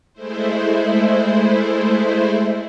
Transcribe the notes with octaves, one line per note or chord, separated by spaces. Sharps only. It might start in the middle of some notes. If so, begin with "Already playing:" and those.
G#3 A3 E4 C5